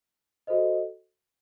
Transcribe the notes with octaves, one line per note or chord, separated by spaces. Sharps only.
F#4 A4 C5 D#5